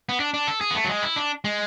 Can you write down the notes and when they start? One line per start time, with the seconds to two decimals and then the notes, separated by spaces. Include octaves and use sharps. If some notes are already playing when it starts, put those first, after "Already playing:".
0.09 B3
0.20 D4
0.34 D4
0.48 A4
0.61 G#4
0.71 B3
0.75 A3
0.84 F#3
0.89 G#3
1.03 E4
1.16 D4
1.44 G#3